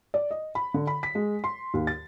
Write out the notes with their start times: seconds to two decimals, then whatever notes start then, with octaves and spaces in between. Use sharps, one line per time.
0.14 D5
0.31 D#5
0.55 B5
0.74 D3
0.87 B5
1.03 B6
1.15 G#3
1.44 C6
1.74 D#2
1.87 A6